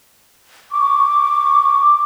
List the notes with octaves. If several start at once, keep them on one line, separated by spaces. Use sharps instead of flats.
C#6 D6